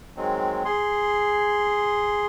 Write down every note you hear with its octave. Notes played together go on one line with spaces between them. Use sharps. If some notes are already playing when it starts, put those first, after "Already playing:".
D#3 F#3 G#3 C4
G#4 C6